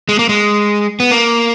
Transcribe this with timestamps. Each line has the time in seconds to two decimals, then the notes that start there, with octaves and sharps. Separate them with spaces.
0.09 G#3
0.19 A#3
0.29 G#3
1.00 B3
1.11 A#3